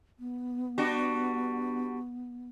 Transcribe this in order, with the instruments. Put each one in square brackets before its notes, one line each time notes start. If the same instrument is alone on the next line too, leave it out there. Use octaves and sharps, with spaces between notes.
[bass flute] B3
[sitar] G3 D4 F#4